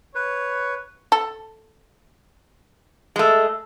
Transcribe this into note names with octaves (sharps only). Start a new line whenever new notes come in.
B4 C#5
A4
G#3 A3